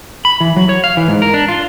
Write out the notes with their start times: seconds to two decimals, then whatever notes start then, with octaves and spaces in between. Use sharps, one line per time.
0.25 B5
0.40 E3
0.56 F#3
0.69 C#5
0.84 F5
0.97 E3
1.08 G#2
1.22 A#4
1.34 D4
1.48 F4